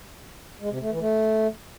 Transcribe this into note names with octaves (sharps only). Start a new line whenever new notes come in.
G#3
C3
A3
E3
A3